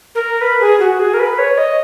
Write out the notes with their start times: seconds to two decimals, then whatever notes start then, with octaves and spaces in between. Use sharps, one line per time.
0.15 A#4
0.41 B4
0.60 G#4
0.80 F#4
0.99 G#4
1.14 A#4
1.19 B4
1.38 C#5
1.58 D#5